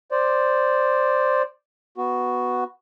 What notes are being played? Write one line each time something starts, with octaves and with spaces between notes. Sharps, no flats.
C5 D5
B3 F#4